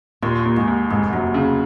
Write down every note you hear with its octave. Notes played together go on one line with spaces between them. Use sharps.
D#2 A#2
D#2
G#2
D#2
F1 G#2
F#2 F#3
C#3